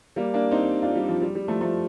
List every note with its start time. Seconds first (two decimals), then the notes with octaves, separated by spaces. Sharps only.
0.16 G3 A#3
0.34 A#3 D4
0.51 C4 D#4
0.82 D4 F4
0.95 G3
1.09 F3
1.22 G3
1.35 G3
1.48 F3 A3
1.61 F3 A3